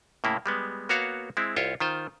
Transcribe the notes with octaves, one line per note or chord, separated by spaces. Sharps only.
A2 C#3 A#3 E4
G3 G#3 B3
A#3 B3 F#4 C#5 F5
G#3 C4 E4
C2 F4 C#5 E5 G5
D#3 F4 C5